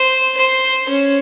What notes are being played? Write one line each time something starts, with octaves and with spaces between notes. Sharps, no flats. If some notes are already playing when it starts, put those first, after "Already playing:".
Already playing: C5
C5
C#4